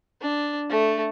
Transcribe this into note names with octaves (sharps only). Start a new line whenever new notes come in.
D4
A3